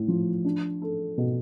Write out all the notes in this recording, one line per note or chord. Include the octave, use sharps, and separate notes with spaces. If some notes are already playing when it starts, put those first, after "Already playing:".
Already playing: A2
F3
D4
A4
B2